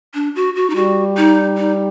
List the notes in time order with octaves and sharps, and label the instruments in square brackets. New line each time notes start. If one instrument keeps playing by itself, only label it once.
[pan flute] D4
F#4
F#4
D#4
[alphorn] G3 [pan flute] F#4
[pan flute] D#4
D#4